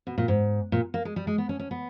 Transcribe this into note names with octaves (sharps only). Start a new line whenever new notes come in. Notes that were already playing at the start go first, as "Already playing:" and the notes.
B2
A#2
G#2
A#2
A#3
G#3
G3
G#3
B3
C#4
C#4
B3